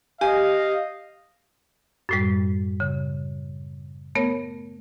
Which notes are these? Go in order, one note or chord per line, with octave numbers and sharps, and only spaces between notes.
G4 D#5 F5 G#5
F#2 A2 G3
C#3
A3 B3 A#4 C#5